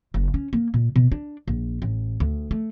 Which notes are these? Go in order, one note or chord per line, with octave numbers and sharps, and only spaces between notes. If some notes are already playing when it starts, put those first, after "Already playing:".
F#1
C#4
A#3
A#2
B2
D4
A#1
A1
D2
A3